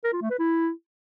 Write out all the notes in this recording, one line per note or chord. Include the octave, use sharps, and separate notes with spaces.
A#4
F4
A3
B4
E4